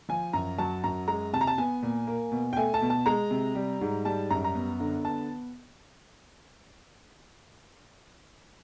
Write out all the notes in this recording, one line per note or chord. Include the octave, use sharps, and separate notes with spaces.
F3 G#5
F#2 A#5
F#3 A5
F#2 A#5
G#3 A#5
C3 A5
A#5
A5
B3 G#5
A#2
A#3
B2
G5
A3 G#5
A5
B2
A5
G#3 A#5
C3
G3
G#2
G3 A5
F#2 A#5
A#5
B3
D3
B3 A5